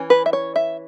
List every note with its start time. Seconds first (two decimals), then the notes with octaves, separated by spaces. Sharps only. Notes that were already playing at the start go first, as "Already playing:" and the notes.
Already playing: E3 C#4
0.10 B4
0.26 E5
0.33 C#5
0.56 E5